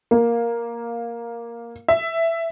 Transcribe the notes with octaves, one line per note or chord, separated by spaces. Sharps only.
A#3
E5